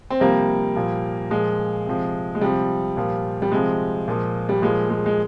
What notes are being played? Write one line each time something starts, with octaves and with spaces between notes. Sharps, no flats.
C4
C3 F3 G3 A#3
A#2 F3
A#2 F3 G#3
C3 F3
G#3
C3 F3 G3
A#2 F3
G3
C3 F3 G#3
A#2 F3
G3
A#2 F3 G#3
G#3
G#3